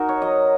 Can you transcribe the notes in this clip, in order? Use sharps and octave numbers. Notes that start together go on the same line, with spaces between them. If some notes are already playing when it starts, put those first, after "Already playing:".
Already playing: D#4 F#4 A#4
C#5
F#3 D#5